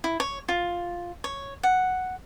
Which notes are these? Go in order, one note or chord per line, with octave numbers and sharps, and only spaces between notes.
E4
C#5
F4
C#5
F#5